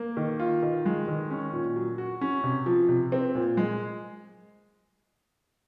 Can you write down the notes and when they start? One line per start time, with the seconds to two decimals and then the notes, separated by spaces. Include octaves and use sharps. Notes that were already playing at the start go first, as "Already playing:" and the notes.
Already playing: A#3
0.17 D#3
0.40 F4
0.63 D#3
0.86 G#3
1.08 D#3
1.30 C#4
1.53 A#2
1.76 F#3
1.98 F#4
2.21 C#4
2.44 C3
2.66 F3
2.89 C3
3.12 C4
3.35 A#2
3.57 G#3